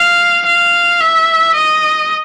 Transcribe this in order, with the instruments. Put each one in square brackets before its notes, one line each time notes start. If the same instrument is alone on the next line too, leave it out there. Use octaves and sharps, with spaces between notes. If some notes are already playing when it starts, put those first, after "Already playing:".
Already playing: [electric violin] F5
F5
E5
D#5